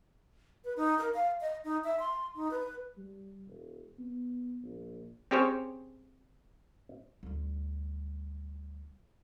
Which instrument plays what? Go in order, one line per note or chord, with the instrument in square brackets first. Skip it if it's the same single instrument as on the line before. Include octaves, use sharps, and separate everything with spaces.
[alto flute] B4
D#4
A#4
F5
D#5
D#4
E5
C6
D#4
B4
[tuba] G3
E1
B3
A#1
[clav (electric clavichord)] C4 C#4 G4 G#4 C5 C#5
[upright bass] D2 G3